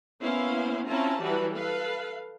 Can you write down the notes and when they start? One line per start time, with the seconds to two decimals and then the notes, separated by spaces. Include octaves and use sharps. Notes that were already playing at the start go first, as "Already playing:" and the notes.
0.21 A#3 B3 C#4 E4 C5 F5
0.87 C4 C#4 E4 F4 A5 A#5
1.20 E3 F#3 G3 F#4 B4 A5
1.53 A4 B4 F5